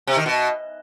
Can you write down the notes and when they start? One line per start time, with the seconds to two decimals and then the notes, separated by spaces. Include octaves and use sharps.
0.07 C3
0.17 D#3
0.26 B2